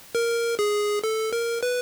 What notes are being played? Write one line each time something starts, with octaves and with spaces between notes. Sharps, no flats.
A#4
G#4
A4
A#4
B4